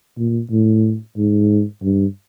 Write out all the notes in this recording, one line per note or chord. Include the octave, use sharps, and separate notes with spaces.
A#2
A2
G#2
G2